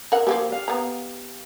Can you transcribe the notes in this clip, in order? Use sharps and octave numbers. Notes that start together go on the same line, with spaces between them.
A#4 F#5 E6
F3 A#3 B3 G4
F5
B3 A#5